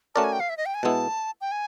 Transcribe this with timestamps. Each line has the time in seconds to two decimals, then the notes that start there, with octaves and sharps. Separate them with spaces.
0.15 A3 C#4 F#4 A#4 D5 A5
0.24 G#5
0.33 G5
0.40 F5
0.49 E5
0.57 D#5
0.66 G5
0.75 G#5
0.83 B2 G#3 B3 E4 A5
1.41 G5
1.52 G#5